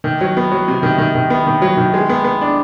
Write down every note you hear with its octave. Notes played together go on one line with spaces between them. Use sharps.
D#3
F#3
B3
F#3
C3
D#3
D#3
D#3
B3
D#3
F#3
D#3
G#3
B3
B3
D4